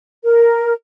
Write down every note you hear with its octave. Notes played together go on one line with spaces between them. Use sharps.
A#4